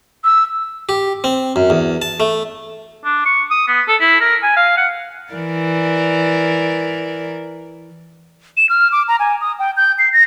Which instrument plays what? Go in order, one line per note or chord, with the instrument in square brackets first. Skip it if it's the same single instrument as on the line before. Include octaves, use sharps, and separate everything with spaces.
[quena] E6
[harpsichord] G4
C4
F#2
E2
A5
A3
[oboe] D4
C#6
D#6
B3
A4
E4
A#4
G#5
F5
F#5
[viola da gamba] E3 A#4 D5
[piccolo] E7
F6
D6
A#5
G#5
D#6
G5
G6
C7
A#6